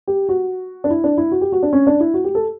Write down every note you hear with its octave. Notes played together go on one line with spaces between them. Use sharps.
G4
F#4
D4
E4
D4
E4
F#4
G4
F#4
D4
C#4
D4
E4
F#4
G4
A4